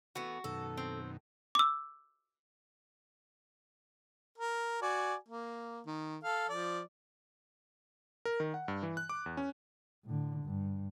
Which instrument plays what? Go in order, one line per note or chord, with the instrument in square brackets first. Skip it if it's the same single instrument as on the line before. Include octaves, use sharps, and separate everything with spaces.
[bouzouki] E3 A3 B3 [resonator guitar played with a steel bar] F#4
[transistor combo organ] F#2 B2 D#3 [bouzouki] A4
[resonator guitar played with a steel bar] C4
[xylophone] D6 E6
[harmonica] A#4
F#4 D5 G#5
A#3
D#3
A4 F5
F3 D5
[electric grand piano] A#4
D#3
F#5
G2
E3
F#6
D6
E2
C#4
[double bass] A2 D3
G2